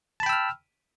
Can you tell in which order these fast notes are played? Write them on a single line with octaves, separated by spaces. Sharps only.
A5 B5 G5 E6 F6